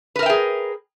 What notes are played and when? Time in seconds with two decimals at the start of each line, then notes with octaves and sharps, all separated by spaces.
0.16 B4
0.19 A#4
0.23 E5
0.26 G5
0.29 G#4